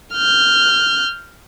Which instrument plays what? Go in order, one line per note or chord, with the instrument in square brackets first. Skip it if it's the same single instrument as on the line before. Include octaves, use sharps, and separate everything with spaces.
[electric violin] F6 G6